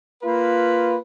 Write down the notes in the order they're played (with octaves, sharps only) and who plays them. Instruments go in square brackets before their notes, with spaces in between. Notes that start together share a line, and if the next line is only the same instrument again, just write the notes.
[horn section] A#3 F4 B4